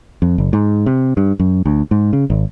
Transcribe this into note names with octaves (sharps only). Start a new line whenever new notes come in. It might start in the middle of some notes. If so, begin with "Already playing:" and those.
F2
F#1
G#2
C3
G2
F#2
D2
G#2
C#3
G#1